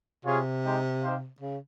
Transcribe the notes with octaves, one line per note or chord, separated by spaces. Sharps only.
C3 F4 G#4 C#5 F5
G#3 D#4 G4 C5
D#4 G4 C5 F5
C#3